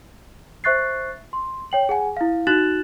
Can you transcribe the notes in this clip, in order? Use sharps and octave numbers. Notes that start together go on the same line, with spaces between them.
C5 E5 C#6 F#6 A6 C7
C6
C#5 G5 F#7
G#4 F#5 G#5
E4 F5
D#4 F#4 F#6 A6 E7 F#7